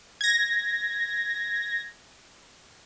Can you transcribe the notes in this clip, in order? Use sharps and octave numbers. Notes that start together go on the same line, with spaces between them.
G#6 A#6